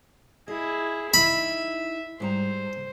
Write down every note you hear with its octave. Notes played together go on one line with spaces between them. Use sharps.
E4 G#4 D#5
D#4 E4 D#5 E5 B5
G#2 G3 C5 A#5